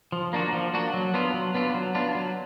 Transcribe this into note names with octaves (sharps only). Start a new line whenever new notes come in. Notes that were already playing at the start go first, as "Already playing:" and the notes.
F3
A#3 D4 F#4
F3
A#3 D4 F#4
F#3
B3 D4 F4
F#3
B3 D4 F4
F#3
B3 D4 F4
F#3